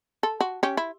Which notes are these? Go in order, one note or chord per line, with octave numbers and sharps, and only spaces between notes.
A4
F#4
C#4 G4
E4